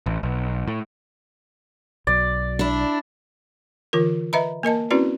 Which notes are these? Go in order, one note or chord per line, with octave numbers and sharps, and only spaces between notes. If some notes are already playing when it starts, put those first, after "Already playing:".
A1
B1
A2
B1 F#3 D5
D4 E4
D3 E3 F4 A#4
B4 D#5 E5 A#5 B5
A#3 A#4 D#5 A5
C4 C#4 E4 F#4 B4 D5